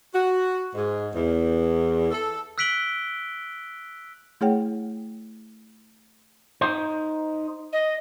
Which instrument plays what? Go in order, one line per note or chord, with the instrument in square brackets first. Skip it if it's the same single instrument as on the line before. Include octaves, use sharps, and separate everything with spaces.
[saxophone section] F#4
G#2
E2
A4
[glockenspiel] E6 F#6 B6 D7 F#7 G7
[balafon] A3 E4 G#4 C#5 F#5 G5
[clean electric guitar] D#4 C5
[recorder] D#5